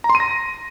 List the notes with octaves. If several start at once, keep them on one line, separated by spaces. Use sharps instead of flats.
A#5
C6
D#7
A#6